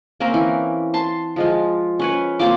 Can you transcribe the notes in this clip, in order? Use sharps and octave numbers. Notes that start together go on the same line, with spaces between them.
A#3 C4 C#4 A#4
E3
A5 C6
F3 G#3 F4
C#4 B4 C#5
A#3 C4 F4 D6